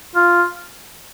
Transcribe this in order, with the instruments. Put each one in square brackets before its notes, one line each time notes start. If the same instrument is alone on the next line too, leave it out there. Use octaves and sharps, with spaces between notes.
[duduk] F4